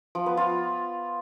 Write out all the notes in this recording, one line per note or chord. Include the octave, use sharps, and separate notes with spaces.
F3
B3
F4